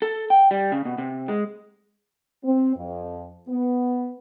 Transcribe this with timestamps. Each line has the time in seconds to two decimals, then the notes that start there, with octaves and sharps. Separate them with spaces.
0.02 A4
0.30 G5
0.51 G3
0.72 C#3
0.85 B2
0.98 C3
1.28 G#3
2.44 C4
2.76 F2
3.49 B3